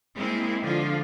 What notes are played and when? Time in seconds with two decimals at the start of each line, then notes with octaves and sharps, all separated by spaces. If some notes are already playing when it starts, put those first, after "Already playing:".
0.14 G#3 A#3 C4 E4
0.62 D3 F3 F4